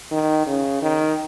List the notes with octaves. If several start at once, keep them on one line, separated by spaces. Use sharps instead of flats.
D#3
C#3
D#3